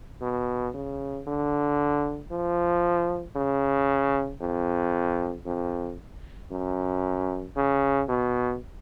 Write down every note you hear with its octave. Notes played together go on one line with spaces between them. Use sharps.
B2
C#3
D3
F3
C#3
F2
F2
F#2
C#3
B2